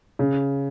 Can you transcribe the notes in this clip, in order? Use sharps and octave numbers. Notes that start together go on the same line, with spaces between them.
C#3